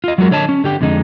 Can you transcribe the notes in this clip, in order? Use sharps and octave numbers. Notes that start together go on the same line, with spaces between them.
F4 D#5
F#3 G#3 F#4 A#4
D3 C#5 D#5 A5
C#4
D3 G4 G5
F2 D3 G#3 D4 D#4